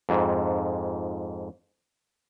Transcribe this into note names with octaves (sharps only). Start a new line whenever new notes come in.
F2 G#2